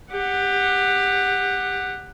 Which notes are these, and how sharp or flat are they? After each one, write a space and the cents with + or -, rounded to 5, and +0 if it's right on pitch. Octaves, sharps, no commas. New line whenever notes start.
G4 +20 F#5 +0